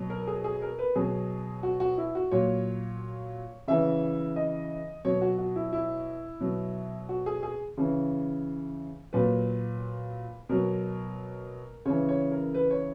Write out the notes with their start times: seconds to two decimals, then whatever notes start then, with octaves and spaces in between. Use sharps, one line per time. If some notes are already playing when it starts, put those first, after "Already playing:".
Already playing: B2 F#3
0.10 A#4
0.27 G#4
0.44 G#4
0.62 A#4
0.79 B4
0.95 B2 F#3 G#4
1.63 F#4
1.80 F#4
1.98 E4
2.15 F#4
2.31 A#2 F#3 C#5
3.67 C#3 E3 E5
4.36 D#5
5.05 B2 F#3 C#5
5.21 F#4
5.38 F#4
5.56 E4
5.73 E4
6.40 B2 F#3
7.09 F#4
7.26 G#4
7.43 G#4
7.77 C#3 E3
9.13 A#2 F#3 B4
10.49 B2 F#3 A#4
11.85 C#3 E3 C#5
12.09 C#5
12.32 A#4
12.54 B4
12.71 C#5